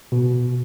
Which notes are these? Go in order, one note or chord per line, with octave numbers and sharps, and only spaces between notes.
B2